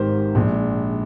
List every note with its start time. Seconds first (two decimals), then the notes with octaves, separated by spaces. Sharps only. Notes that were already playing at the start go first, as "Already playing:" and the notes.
Already playing: G#1 G#2 D#3 G4 A#4 C5
0.35 A#1 A#2 G#3